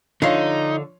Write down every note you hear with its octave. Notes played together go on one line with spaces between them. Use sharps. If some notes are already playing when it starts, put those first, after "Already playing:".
D3 F3 D#4 C#5 F5 C6